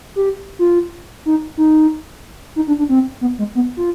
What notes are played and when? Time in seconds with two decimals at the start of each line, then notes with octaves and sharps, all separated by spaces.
0.16 G4
0.59 F4
1.26 D#4
1.57 D#4
2.56 D#4
2.67 D4
2.78 D4
2.89 C4
3.21 B3
3.38 G#3
3.55 B3
3.77 F4